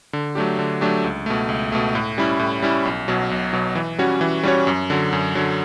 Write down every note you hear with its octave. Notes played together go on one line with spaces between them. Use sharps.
D3
F#3 A3 D4 G4
D3
F#3 A3 D4 G4
C#2
B2 A3
C#2
B2 A3
A2
G3 C#4 E4
A2
G3 C#4 E4
B1
B2 F#3
B1
B2 F#3
E3
G3 C#4 F#4 C#5
E3
G3 C#4 F#4 C#5
F#2
D3 F#3
F#2
D3 F#3